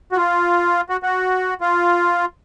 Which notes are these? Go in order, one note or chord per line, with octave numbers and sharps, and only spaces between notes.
F#4
F4
F#4
F#4
F4